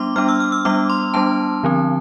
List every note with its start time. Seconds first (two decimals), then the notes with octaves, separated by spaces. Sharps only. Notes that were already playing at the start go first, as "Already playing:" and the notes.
Already playing: G3 B3 D4 C6 D6
0.16 G3 B3 D4 F6
0.29 E6
0.40 F6
0.52 E6
0.65 G3 B3 D4 D6
0.90 C6
1.14 G3 B3 D4 A5
1.63 D3 F3 C4